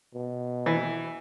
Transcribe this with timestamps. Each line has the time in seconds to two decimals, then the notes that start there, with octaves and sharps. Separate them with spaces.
0.14 B2
0.66 E3